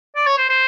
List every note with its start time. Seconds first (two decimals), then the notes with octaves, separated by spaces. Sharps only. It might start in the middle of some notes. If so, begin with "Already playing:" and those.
0.16 D5
0.26 C#5
0.38 C5
0.49 C5